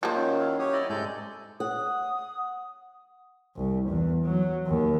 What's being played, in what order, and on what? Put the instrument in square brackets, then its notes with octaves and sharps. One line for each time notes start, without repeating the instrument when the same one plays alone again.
[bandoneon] D#3 F#3 [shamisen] F3 A#3 [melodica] F4 C5
[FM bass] C#4
[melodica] E4 F5
[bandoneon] F#3 G4 C#5 [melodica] D#6
[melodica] E4 D5 D#5
[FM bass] G#2 [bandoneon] C3 G#3 G6 [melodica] A4 D5 G#5
[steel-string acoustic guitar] F#5 [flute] D#6
[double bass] C2
E2
F#3
D#2